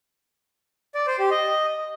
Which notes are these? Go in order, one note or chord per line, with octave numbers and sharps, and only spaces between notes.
D5
C5
G4
D#5